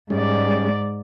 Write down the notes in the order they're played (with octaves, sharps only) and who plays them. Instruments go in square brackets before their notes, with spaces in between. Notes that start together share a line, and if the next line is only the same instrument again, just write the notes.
[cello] G#2 D5 [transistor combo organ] G3 G#3 C#4